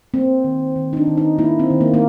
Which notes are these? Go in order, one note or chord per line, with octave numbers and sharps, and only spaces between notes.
A#3 C4
D#3
D#3
D#4
D4
D#3
D#4
A#3 E4
C4
D#3
A#3
A#3